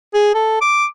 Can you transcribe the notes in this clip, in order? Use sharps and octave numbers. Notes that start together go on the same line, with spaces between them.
G#4
A4
D6